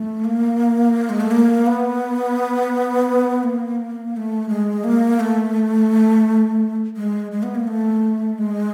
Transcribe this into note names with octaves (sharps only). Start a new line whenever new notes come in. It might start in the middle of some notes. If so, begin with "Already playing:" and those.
Already playing: A3
A#3
G#3
A3
A#3
B3
A#3
A#3
A3
G#3
A#3
A3
G#3
G#3
B3
A#3
A3
G#3